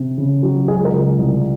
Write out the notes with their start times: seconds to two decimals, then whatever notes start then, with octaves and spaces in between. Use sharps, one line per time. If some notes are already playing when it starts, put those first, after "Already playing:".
Already playing: C3
0.18 C#3
0.43 F#3
0.68 C#2 G#4
0.85 A#4
0.93 C#2
1.19 C2